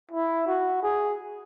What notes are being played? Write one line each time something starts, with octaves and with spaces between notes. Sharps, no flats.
E4
F#4
G#4